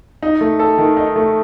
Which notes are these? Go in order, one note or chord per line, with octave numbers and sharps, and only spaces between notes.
D#4
A3
A4
D#3
D#4
A3